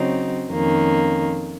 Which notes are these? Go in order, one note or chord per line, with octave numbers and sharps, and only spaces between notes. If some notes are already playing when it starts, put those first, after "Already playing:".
Already playing: C#3 F#3 C4 D#4
F2 D#3 A#3 C#4